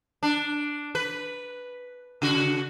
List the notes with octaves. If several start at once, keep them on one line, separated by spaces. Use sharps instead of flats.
D4
B4
C#3 F#4